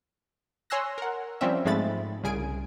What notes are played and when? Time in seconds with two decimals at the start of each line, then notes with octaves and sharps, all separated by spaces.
0.70 C#5 G#5 C6 E6 F#6 A#6
0.98 A#4 F#5
1.41 F3 G3 C4 C#4 E5
1.65 G#2 F3 G#3 A3 B5 A6
2.24 C2 C#3 G#4 G#5 D7